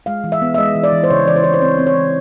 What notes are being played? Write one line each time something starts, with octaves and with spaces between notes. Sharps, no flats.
G#3 F5
E3
E5
B3
E5
G#3 D#5
E3
D5
E3
C5
C#3 C#5
E3 D5
C5
E3 C#5
C5
C4 C#5
C4
C#5
E3